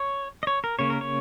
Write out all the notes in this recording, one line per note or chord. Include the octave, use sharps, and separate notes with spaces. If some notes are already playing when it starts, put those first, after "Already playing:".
Already playing: C#5
D#5
C#5
A#4
C#3 A#3 C#4 C#5
A#4
C#5